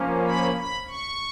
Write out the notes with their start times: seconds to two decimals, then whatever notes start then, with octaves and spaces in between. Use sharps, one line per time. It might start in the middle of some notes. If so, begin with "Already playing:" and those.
Already playing: F3 A#3 C#4
0.24 B5
0.56 B5
0.88 C#6